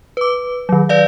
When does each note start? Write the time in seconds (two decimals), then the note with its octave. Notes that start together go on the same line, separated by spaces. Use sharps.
0.17 B4 D6
0.69 D#3 F#3
0.89 B4 D5 F5